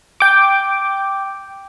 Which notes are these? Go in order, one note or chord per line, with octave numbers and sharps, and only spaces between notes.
G5 D6